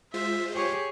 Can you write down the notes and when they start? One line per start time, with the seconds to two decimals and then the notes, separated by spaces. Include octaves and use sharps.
0.14 G#3 F4 C5 E5
0.55 G4 G#4 C#5